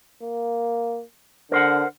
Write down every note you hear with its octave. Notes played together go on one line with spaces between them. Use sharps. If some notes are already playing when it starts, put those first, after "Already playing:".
A#3
D3 A#4 C5 F#5